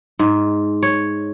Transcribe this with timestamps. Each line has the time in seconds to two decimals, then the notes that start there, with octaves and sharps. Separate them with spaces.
0.19 G#2
0.83 C#5